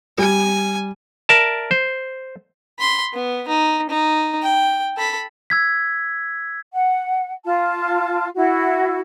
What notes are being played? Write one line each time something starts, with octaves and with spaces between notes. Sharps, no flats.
G3 G#5
A#4 D5 E5 A5
C5
B5 C6
B3
D#4
D#4
G5
A4 B5
E6 G#6 B6
F#5
F4 A5
E4 F#4